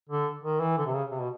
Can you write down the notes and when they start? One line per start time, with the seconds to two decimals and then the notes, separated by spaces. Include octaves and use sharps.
0.09 D3
0.44 D#3
0.60 E3
0.78 D3
0.86 C3
0.94 C#3
1.11 C3
1.20 B2